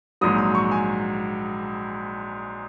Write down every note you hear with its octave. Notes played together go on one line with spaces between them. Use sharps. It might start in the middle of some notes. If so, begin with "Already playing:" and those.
A#1 G#2 F#3 D#6
D#6
C#6
G#5